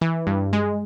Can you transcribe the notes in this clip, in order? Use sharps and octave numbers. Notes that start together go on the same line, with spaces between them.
E3
G2
G#3